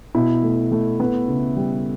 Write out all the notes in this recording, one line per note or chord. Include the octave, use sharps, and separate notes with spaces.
B2 E4
A3
A3
B3
C#3
G3